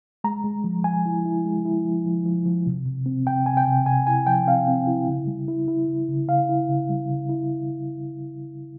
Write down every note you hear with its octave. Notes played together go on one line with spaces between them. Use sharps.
G#3 A#5
G#3
F3
F3 G#5
E4
E4
G#3
E4
F3
F3
F3
F3
C3
C3
C4
C3 G5
C3 G#5
G5
C3
C3 G#5
E4 G#5
F3 G5
C4 F5
C4
E4
C#3
G3
E4
E4
C#3
C#3
C#3 F5
E4
C#3
G3
C#3
E4